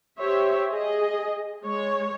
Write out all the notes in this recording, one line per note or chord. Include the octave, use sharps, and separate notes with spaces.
G4 C5 C#5 E5
G#4 D#5
G#3 C#5